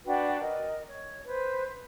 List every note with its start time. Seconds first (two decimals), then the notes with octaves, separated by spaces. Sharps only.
0.04 D4 F#4 B4 G5
0.39 A#4 D#5
0.87 C#5
1.25 B4 C5